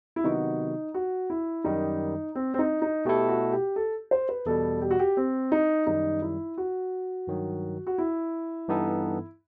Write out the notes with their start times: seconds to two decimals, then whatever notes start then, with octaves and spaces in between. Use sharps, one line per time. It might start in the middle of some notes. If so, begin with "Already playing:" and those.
0.16 E4
0.24 C3 D#3 F#3 B3 D#4 F#4
0.94 F#4
1.30 E4
1.64 F#2 D#3 G3 D#4
2.35 C4
2.54 C4
2.59 D#4
2.82 D#4
3.05 B2 A3 E4 G4 A4
3.29 F#4
3.52 G4
3.76 A4
4.11 C5
4.29 B4
4.46 E2 B2 G3 A4
4.82 G4
4.91 F#4
4.99 G4
5.17 C4
5.52 D#4
5.87 F#2 D#3 G3 D#4
6.22 E4
6.58 F#4
7.27 G2 D#3 F#3
7.87 F#4
7.98 E4
8.68 G2 E3 B3 D#4 A4